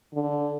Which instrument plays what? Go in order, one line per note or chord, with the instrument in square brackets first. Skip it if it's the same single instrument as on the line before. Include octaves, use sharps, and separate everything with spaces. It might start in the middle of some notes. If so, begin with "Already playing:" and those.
[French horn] D3